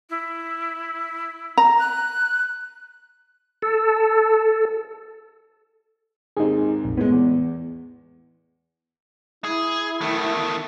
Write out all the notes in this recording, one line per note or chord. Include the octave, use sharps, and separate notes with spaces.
E4
A#5
F#6
A4
D#2 G#2 C4 D#4 G#4
A#1 F2
A2 G#3 B3
E2
E4 G#4
D#3 A3